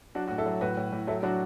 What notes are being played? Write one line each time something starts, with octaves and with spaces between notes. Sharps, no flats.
F#3 D4 F#4
A2 F#4
E4 A4
F#3
A2 F#4 B4
A2
A2
F#3 E4 A4
F#3 D4 F#4